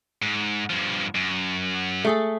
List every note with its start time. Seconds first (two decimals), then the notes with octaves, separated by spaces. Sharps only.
0.22 G#2
0.70 G2 F3
1.15 F#2
2.05 A3 G#4 A4